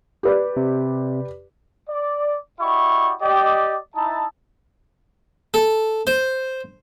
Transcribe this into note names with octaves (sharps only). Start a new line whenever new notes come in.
G4 B4 D5
C3
D5
E4 F#4 G4 D5 D#5 C#6
G4 D5 D#5
D#4 E4 A5
A4
C5